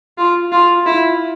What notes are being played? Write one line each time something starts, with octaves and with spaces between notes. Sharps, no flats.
F4
F4
E4